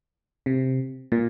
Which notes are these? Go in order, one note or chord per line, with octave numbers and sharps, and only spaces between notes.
C3
A#2